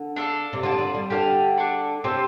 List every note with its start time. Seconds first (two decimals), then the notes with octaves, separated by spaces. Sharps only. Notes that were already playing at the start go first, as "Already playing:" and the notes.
Already playing: D3
0.16 D4 A4 F5
0.53 C3
0.63 D3 F4 D5 A5
0.72 F3
0.78 D3
0.95 G3
1.10 D3 G4 F5 A5
1.57 D4 A4 D5
2.04 C3 C4 F4 A4